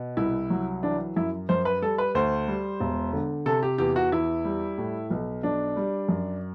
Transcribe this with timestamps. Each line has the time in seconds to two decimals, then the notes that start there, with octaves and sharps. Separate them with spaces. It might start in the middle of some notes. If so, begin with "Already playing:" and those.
Already playing: B2
0.17 C2 E4
0.50 F#3
0.83 E3 D4
1.16 F#2 E4
1.49 F#2 C5
1.65 B4
1.82 G3 A4
1.98 B4
2.15 D2 C5
2.48 G3
2.80 E1
3.13 D3
3.46 C3 A4
3.63 G4
3.78 E2 G4
3.96 F#4
4.12 E2 E4
4.45 G3
4.78 A2
5.10 B1
5.43 B1 D4
5.76 G3
6.09 F#2